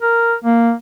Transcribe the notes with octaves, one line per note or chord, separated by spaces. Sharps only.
A#4
A#3